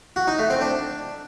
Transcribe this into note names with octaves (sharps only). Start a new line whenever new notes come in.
F#4
D#4
A3
C4
D4